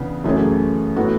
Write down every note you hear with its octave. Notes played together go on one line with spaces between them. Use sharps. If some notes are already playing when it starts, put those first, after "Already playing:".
Already playing: C#3 E3 B3 D4
F#2 E3 A3 C#4 G#4
A2 E3 B3 F#4 A4